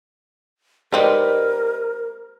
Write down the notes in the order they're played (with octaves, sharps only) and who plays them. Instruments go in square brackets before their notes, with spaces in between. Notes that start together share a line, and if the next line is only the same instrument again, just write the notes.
[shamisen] G#3 C4 D#4 [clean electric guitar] G4 B4 D5 [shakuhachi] A#4